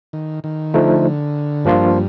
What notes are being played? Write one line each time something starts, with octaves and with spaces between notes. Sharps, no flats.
D#3
D#3
D3 F3 A3 D#4
G2 F3 A#3 D4 F4